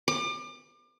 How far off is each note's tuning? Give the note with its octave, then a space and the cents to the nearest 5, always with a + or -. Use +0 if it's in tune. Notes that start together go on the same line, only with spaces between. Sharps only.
D6 +35